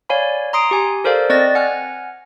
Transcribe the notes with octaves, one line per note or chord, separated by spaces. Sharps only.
C#5 D5 F5 G#5 B5
A#5 C6 D#6 C7 D7
G4 G#5
A4 A#4 C5 D5 F5
C4 D5 D#5 A6 A#6
F#5 G#5 F6